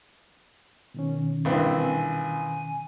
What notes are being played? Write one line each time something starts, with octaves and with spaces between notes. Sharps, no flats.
B2 D#3 C#4
A#1 G2 E3 C4
G#5